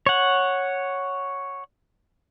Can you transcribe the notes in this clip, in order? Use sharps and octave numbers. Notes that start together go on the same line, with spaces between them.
C#5 F#5